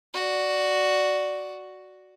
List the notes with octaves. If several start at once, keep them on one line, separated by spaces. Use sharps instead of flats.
F#4 D5